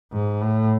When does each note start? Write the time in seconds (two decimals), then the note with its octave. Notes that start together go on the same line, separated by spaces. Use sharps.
0.12 G#2
0.42 A2